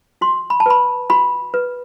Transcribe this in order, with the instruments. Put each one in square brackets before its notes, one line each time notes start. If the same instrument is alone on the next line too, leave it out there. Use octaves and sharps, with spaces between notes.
[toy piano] F#4 C6
B5
A5
B4 B5
F#4 B5
B4